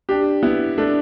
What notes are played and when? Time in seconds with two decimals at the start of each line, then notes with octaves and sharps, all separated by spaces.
0.09 D4 G4
0.43 B3 E4
0.78 A3 D4